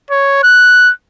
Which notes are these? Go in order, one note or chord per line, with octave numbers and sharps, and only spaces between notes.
C#5
F#6